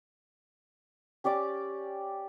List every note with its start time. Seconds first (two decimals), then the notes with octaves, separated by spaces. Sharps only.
1.24 C#4 G4 D5 D6